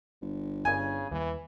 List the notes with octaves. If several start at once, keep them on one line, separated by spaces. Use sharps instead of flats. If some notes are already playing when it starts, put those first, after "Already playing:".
G1
G2 C#3 G#5
D#2 E3 G3